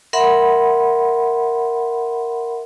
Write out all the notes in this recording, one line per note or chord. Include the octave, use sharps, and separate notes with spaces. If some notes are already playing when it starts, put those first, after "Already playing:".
A#4 E5 F#5 B5 C6